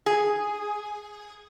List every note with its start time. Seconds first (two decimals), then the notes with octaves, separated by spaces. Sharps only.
0.06 G#4